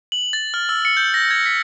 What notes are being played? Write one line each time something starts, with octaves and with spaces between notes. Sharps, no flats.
F#7
A6
F6
E6
C#7
G6
A#6
G#6
B6